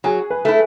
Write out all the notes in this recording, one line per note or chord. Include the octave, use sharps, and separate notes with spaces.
F#3 G#4
B4
A3 E4